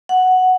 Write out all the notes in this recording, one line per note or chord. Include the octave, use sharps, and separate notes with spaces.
F#5